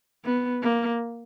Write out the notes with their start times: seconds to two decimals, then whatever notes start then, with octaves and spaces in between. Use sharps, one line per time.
0.25 B3
0.62 A#3